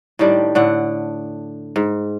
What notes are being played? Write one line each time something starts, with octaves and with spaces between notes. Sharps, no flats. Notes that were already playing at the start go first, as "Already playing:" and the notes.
A2 D#3 G3 D4
A2 D3 F#5
G#2